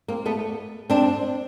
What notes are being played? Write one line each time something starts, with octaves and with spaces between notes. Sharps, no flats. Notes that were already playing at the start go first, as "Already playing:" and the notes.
A#3 C4
A3 B3
C4 D4